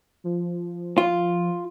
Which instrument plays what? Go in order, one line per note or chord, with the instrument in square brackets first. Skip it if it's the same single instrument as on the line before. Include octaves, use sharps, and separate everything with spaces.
[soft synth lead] F3
[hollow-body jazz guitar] F4